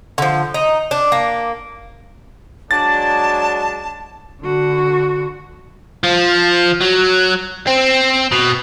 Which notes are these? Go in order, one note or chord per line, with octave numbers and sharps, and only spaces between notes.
D3 F3
D#4
D4
A#3
F#3 G#3 D4 A5 A6
D3 F#4
F3
F#3
C4
B2